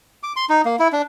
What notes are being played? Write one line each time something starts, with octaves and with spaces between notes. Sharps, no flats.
D6
C6
D#4
A#3
E4
D4